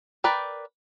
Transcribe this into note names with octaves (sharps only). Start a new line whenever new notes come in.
A#4 B4 D5 G5